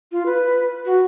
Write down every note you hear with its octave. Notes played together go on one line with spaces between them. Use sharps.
F4
B4
F#4